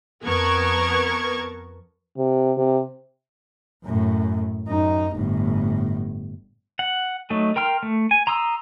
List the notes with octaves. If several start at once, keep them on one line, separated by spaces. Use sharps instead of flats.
F2 B3 A#4 A5 C#6 G#6
C3
C3
F#2 A2
F#2 D#4
G1 A2
F#5
F#3 A3 D#4
A#4 G5 C6 F6
A3
G#5
A#5 C6 D#6 E6